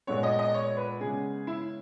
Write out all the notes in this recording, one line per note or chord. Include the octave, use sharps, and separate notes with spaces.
A#2 G#3 B3 C#5
D#5
D#5
C#5
B4
C#3 G#3 B3 G#4
E4